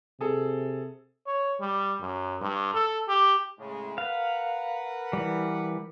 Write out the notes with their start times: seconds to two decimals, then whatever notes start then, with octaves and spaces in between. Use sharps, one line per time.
0.21 C3 G#4 A4
1.27 C#5
1.60 G3
2.01 F#2
2.41 G2
2.74 A4
3.08 G4
3.59 A2 C#3 G#3
3.98 A#4 B4 F5 F#5
5.13 E3 G3